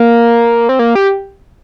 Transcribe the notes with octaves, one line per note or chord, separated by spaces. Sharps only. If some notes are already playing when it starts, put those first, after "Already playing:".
Already playing: A#3
C4
A#3
G4